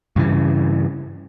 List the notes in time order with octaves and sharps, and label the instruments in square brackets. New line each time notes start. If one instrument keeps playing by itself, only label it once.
[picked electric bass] G2 C#3 E3